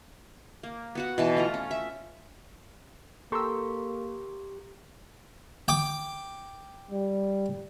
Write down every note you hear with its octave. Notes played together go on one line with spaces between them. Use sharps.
A#3
B3 F#4 F#5
B2 E3 A5
A3 F4 A#5
C#4
E5
A#3 G4 A4 A#5 C6 C#6 E6
G5 D6
G3